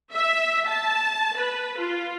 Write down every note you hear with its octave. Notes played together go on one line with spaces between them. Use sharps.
E5
A5
B4
F4